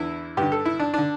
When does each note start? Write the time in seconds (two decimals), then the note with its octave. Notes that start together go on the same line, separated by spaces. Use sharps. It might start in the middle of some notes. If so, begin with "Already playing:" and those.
Already playing: E2 D3 E4
0.37 G2 D3 G4
0.52 A4
0.65 E4
0.79 D4
0.94 D3 D4